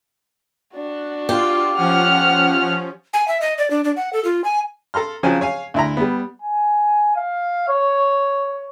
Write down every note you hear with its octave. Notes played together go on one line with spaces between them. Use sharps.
D4 F#4
F4 G4
F3 C#4 F#5 F6
G#5
E5
D#5
D5
D4
D4
F#5
A4
F4
G#5
A4 A#5 C6 F6
C#3 F3 F#3 C4 C#4 G#5
C#5 F5 G#5
D2 E4 A#5
G3 B3
G#5
F5
C#5